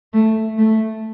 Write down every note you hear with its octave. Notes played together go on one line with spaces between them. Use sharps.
A3
A3